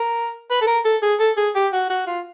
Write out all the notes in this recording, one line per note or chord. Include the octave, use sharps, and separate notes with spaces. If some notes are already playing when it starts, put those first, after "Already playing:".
Already playing: A#4
B4
A4
A#4
A4
G#4
A4
G#4
G4
F#4
F#4
F4